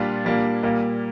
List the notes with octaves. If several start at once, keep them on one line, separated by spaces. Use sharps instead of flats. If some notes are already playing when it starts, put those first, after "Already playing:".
Already playing: A#2 G3 D4 F4
A#2 G3 A#3 D4
A#2 G3 A#3